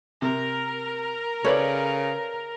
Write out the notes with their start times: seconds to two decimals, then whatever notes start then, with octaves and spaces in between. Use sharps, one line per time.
0.22 C3 A#4
1.44 C#3 A4 B4 C#5 D5